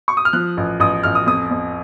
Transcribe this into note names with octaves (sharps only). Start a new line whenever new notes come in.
C#6
D#6
F6
F3 F#6
A1
A1 D#6
A1 F6
D#6
F2 D#6
F2